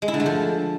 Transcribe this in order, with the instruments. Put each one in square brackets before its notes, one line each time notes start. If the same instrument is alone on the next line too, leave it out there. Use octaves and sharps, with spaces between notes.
[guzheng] G#3
E4
D3
A3
F3